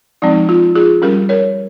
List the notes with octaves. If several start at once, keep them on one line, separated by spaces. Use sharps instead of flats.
F3 G#3 C4 D#4
F4
F4 G#4
G3 C#4 G4 A#4
A#4 C#5